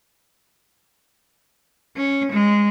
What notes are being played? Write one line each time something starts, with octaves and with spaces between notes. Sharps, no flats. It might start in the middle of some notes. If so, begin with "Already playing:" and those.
C#4
G#3